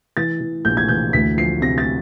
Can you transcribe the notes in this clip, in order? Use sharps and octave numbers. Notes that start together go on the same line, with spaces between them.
E3 A6
E3
A#1 G6
G#6
E3 G6
D2 B6
F3 C7
C3 A#6
A6